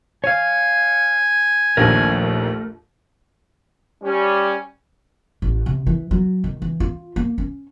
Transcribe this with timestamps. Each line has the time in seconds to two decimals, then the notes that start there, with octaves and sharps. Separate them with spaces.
0.24 C#5 F5 G#5
1.77 A#1 D#2 A3 A#4
4.03 G3 C#4
5.42 A1
5.66 C3
5.87 E3
6.11 F#3
6.44 D#3
6.62 E3
6.80 F4
7.16 A#3
7.38 C#4